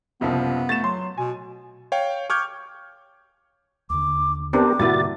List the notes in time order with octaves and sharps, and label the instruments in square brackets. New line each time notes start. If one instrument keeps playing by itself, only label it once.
[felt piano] F#1 C2 F3 [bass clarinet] B3
[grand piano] A3 E7 [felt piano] A6
[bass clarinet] F#3 [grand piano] C6
[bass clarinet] B2 [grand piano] G#5
[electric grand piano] C#5 F5 G5
C#6 D6 F6 G6 G#6
[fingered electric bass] D#2 D3 [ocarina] D6
[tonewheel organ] B3 G4 A#4 [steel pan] C4 D4 [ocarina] D6
[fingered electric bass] G#2 B2 D3 [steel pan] G3 A#3 E4 [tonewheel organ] F#4 A6